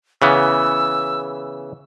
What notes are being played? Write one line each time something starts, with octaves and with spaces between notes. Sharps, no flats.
C#3 E3 B3 E6